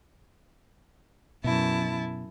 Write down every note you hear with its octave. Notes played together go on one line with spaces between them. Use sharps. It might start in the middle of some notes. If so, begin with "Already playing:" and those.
F#2 B2 E4 A5